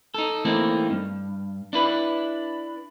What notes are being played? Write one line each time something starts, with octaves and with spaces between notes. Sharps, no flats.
D#4 A4
E3 A3 A#3 C4 D#4
G2
D4 E4 B4